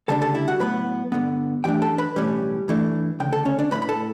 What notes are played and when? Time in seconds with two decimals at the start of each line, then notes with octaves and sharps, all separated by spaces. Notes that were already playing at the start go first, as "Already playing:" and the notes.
0.08 D2 C#3 G3 D4 A4 A5
0.22 A4 A5
0.35 E4 E5
0.48 F#4 F#5
0.60 A2 F#3 B3 B4 B5
1.12 G2 D3 F#3 B3
1.64 F#2 E3 A3 D4 G4 G5
1.82 A4 A5
1.98 B4 B5
2.16 B1 A2 E3 G3 C#4
2.68 G2 E3 A3 D4
3.20 D2 C#3 G5
3.33 A4 A5
3.45 C#4 C#5
3.59 D4 D5
3.71 A2 E3 A3 B4 B5
3.82 B5
3.89 A4 A5